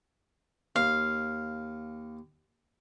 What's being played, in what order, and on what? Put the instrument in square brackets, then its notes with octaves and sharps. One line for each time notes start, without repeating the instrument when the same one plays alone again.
[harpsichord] D#2 [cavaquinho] F5